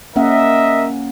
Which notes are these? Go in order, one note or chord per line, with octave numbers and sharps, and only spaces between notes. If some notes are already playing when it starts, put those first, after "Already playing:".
A#3 C#4 A#4 D#5 E5 F#5